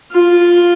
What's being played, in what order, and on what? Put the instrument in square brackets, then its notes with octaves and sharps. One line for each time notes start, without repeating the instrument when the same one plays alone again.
[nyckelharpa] F4